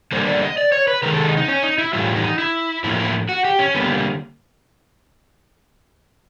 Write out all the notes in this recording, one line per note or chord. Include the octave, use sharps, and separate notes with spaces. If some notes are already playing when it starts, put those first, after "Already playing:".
D3 G3 A#3 C5
D5
D#5
D5
C#5
B4
C3 D#3 G#3 A#4
A4
D#4
D#4
C#4
D#4
E4
A2 E3 G3 F4
D#4
E4
A2 F3 A#3 E4
E4
F#4
G4
C#4
D3 G3 A#3 B3